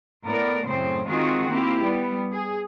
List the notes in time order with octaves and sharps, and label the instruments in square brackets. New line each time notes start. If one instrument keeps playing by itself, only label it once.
[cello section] A2 B3 A#4 D5
F#2 A2 C#3 C4 C5
D#3 G#3 C4 F4 F#4 G#4
A#3 C4 E4 G4
G3 B3
G#4